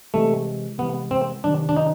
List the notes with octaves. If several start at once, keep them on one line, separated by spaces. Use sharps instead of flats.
C3 E3 G#3 A3
C3 E3 G#3 B3
C4
C3 D#3 F#3 D4
D4
D#4